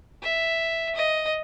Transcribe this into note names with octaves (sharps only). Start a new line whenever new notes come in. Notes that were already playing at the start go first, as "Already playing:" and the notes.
E5
D#5